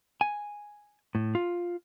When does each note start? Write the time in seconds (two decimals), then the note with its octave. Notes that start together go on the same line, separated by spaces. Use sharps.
0.21 G#5
1.15 A2
1.35 F4